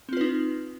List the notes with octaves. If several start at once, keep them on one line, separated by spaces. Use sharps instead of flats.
C4 D#4 F4 B4